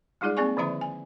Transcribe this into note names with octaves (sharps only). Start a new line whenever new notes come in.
G3 G#3 D#4 F4 G#4 D5
A#3 C4 G#4 D5 G#5 C#6
D3 D#3 F3 E4 E5 A#5
G#5